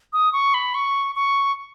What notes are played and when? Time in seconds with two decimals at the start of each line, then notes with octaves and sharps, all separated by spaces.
0.13 D#6
0.33 C#6
0.54 B5
0.75 C#6
1.15 C#6